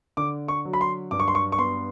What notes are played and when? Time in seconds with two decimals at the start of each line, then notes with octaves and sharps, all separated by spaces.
0.17 D3 D6
0.48 C#6
0.65 F#3
0.73 B5
0.81 C6
1.11 G2 D6
1.20 C#6
1.28 C6
1.35 C#6
1.52 C#6
1.58 B3 C6